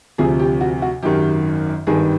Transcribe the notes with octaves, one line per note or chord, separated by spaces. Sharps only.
D2 C3 F3 G#4
G4
F#4
F#4
G#1 F#2 D#3 G4
G#1 G2 D#3 G#4